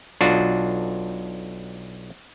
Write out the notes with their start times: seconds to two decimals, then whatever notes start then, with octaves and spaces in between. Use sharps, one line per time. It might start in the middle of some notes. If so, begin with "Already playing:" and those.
0.21 B1 D4 F4 F#4